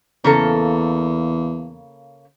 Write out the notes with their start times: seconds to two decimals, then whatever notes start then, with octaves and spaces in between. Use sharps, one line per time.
0.24 E2 C#3 A#3 A4